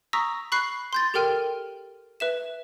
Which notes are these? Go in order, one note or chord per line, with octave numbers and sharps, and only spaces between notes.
A#5 C#6 D#6 E6 A#6 B6
B5 C#6 F#6 C7
C6 G6 A6
G4 A4 A#4 G5 F6 D#7
B4 E5 E7